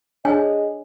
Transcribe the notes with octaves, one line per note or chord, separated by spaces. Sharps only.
D4 G#4 C#5 D#5 G#5